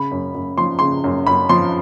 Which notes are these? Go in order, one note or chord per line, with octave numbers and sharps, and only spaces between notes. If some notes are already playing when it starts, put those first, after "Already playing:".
Already playing: C#3 B5
F#2
F#2
F3 C6
C#3 C6
F#2
F#2 B5
F3 C6